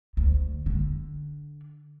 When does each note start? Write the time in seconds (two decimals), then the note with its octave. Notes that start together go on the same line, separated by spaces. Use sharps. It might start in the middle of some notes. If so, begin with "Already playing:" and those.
0.17 D2
0.66 D3